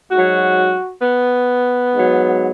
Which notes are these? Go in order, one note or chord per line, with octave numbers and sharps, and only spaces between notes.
G#2 F#4
F#3
B3
G#2 F#3